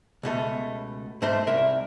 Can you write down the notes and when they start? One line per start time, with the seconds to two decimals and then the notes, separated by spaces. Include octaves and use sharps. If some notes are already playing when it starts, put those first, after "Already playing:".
0.23 C#2 B2 A3
1.22 G#2 A3 C5 E5 C6
1.47 C2 A#4 E5